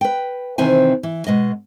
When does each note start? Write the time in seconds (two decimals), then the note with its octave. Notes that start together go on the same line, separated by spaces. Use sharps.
0.01 B4 G5
0.58 C3 D#3 E3 C4 G#5
1.03 E3
1.26 B2 G#3 D#5